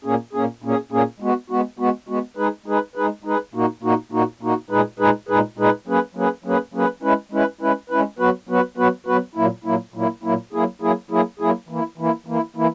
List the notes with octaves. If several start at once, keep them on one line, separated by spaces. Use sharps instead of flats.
A#2 A#3 C#4 G#4
A#2 A#3 C#4 G#4
A#2 A#3 C#4 G#4
A#2 A#3 C#4 G#4
G#3 B3 F#4
G#3 B3 F#4
G#3 B3 F#4
G#3 B3 F#4
G#3 D#4 G#4 B4
G#3 D#4 G#4 B4
G#3 D#4 G#4 B4
G#3 D#4 G#4 B4
A#2 A#3 D#4 F#4
A#2 A#3 D#4 F#4
A#2 A#3 D#4 F#4
A#2 A#3 D#4 F#4
A#2 G#3 D#4 G#4 B4
A#2 G#3 D#4 G#4 B4
A#2 G#3 D#4 G#4 B4
A#2 G#3 D#4 G#4 B4
F#3 A#3 C#4 G#4 B4
F#3 A#3 C#4 G#4 B4
F#3 A#3 C#4 G#4 B4
F#3 A#3 C#4 G#4 B4
G#3 C#4 E4 B4
G#3 C#4 E4 B4
G#3 C#4 E4 B4
G#3 C#4 E4 B4
F#3 B3 F#4 B4
F#3 B3 F#4 B4
F#3 B3 F#4 B4
F#3 B3 F#4 B4
A#2 F#3 A#3 E4
A#2 F#3 A#3 E4
A#2 F#3 A#3 E4
A#2 F#3 A#3 E4
F#3 A#3 E4 G#4
F#3 A#3 E4 G#4
F#3 A#3 E4 G#4
F#3 A#3 E4 G#4
E3 A#3 E4
E3 A#3 E4
E3 A#3 E4
E3 A#3 E4